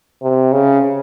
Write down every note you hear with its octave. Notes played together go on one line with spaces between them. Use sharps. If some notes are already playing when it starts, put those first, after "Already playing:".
C3
C#3